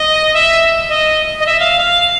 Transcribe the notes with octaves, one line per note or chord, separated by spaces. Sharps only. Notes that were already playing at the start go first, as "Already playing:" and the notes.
Already playing: D#5
E5
D#5
D#5
E5
F5